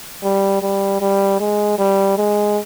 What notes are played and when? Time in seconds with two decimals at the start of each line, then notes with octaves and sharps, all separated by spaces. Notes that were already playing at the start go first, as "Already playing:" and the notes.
0.24 G3
0.62 G3
1.01 G3
1.40 G#3
1.79 G3
2.17 G#3